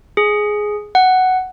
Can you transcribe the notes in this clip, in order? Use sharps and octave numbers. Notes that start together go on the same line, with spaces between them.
G#4
F#5